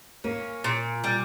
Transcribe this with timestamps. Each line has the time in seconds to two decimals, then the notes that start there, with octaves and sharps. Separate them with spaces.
0.24 A#3 C#4
0.64 A#2
1.04 G3